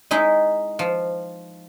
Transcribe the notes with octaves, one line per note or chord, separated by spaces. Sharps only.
G#3 D#4 E4
F3